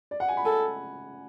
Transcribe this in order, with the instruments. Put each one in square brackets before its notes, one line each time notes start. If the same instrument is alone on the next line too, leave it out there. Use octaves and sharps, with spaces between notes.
[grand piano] D5
F#5
G#5
B5
[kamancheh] A4 [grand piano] G#5